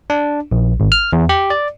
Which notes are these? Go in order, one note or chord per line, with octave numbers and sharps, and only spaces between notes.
D4
A#1
G#1
F6
E2
G4
D5